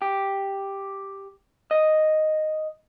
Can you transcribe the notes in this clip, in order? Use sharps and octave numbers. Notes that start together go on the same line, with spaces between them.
G4
D#5